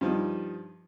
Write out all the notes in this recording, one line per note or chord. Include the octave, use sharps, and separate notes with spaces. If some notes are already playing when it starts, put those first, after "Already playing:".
G2 F3 D#4